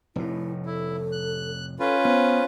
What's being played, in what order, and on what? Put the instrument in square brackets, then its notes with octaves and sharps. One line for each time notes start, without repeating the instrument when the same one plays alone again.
[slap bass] F1 A2 [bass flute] E4
[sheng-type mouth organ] E4 [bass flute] A4
[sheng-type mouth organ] F#6
[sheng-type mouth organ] C#4 F4 B4 [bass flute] A4
[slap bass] B3 [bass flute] C5